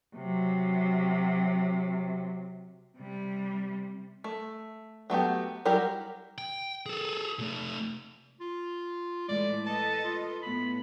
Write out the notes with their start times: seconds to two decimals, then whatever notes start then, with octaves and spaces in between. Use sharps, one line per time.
0.16 C3 F#3
2.97 C3 G3
4.24 A3
5.10 F#3 A3 B3 G4
5.65 F#3 G3 E4 G4 A#4
6.38 G5
6.86 G#4 A4
7.39 C3 A3
8.40 F4
9.28 A2 E3 G#3 D5
9.66 A4 B4 D#5 A5
10.04 F4
10.42 A2 B3 B5